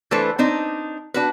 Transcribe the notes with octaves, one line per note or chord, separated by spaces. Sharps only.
E3 A3 D4 A4 B4 C5
C4 D4 D#4
D4 F#4 B4